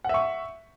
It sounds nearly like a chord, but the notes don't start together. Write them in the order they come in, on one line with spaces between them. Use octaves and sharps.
F#5 E5 C#6